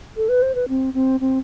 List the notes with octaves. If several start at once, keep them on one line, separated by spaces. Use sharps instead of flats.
A4
B4
C5
B4
C4
C4
C4